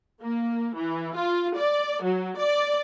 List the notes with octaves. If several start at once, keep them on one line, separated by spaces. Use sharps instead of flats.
A#3
E3
F4
D5
F#3
D5